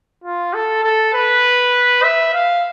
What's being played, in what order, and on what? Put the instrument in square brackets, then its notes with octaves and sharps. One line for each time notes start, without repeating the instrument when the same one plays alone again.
[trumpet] F4
A4
A4
B4
E5
F5